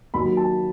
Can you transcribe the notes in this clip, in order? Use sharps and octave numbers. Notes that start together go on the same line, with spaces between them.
D#2 D#3 F#3 B5
A5